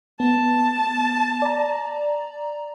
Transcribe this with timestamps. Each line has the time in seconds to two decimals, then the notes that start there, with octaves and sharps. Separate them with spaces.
0.20 B3 A5
1.42 D5 A#5